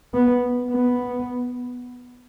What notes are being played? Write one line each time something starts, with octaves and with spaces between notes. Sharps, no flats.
B3
B3